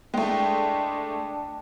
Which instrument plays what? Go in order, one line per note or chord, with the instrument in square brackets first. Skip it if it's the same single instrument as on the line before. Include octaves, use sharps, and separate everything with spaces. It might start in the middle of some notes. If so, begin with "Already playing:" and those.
[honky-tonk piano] G#3 A3 [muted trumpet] D4 [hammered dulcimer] G5